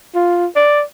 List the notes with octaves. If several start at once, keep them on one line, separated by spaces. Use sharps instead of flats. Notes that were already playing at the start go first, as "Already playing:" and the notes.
F4
D5